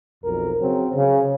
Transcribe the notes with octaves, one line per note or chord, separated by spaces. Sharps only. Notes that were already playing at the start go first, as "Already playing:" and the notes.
B1 F2 A#4
C#3 F#3 C4
C#3